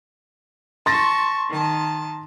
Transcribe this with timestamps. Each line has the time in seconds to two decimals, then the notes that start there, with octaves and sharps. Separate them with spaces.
0.86 A5 C6 C#6 A6 A#6
1.50 D#3 A5